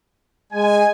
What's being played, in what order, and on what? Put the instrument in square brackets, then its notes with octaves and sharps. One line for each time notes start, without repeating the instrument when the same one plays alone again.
[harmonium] G#3 [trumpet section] G#5